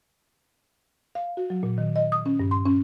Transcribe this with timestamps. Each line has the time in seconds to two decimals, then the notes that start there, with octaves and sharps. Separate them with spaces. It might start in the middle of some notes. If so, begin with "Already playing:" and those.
1.15 F5
1.37 F#4
1.50 F#3
1.63 A#2
1.78 D#3
1.96 D#5
2.12 D#6
2.26 C#4
2.39 G2
2.51 C6
2.66 C#4